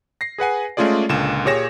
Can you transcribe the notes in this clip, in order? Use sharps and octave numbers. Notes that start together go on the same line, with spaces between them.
A#6 C7
G#4 B4 F#5 G#5
G#3 A3 C#4 F4 G#4 D5
C#2 A#2 D3 E7
A#2 G4 G#4 C#5 A#6 E7